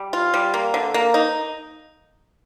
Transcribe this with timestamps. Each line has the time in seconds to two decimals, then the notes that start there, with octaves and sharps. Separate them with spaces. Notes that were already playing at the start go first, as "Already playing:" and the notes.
Already playing: G3
0.13 F4
0.34 G3
0.54 A#3
0.74 D3
0.94 A#3
1.14 D#4